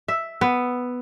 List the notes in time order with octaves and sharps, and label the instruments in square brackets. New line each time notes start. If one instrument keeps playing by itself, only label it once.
[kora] E5
B3